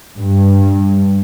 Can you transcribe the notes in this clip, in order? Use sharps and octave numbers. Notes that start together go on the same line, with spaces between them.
G2